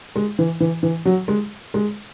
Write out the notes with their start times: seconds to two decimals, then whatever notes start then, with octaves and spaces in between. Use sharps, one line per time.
0.16 G#3
0.39 E3
0.60 E3
0.83 E3
1.05 F#3
1.28 G#3
1.74 G#3